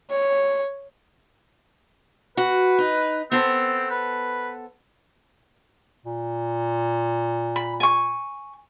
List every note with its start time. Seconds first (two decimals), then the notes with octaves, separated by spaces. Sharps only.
0.10 C#5
2.37 F#4 B4
2.78 D#4
3.32 B3 C4 A4 C5
3.91 B4
6.06 A#2
7.56 B5
7.80 G#5 C#6